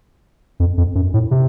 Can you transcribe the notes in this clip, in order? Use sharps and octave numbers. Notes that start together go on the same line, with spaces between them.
F2
F2
F#2
A2
C3